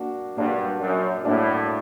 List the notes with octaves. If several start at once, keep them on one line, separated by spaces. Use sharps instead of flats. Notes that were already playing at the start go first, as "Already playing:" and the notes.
Already playing: A#3 D4 F#4
G2 A#3 D4 F#4
F#2
A2 A#3 D4 F#4